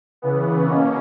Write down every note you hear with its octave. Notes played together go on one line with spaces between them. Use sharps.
C#3 E3 B3
B2 A#3 C#4